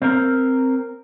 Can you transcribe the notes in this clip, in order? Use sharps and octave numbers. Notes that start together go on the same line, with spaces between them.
C4 A#4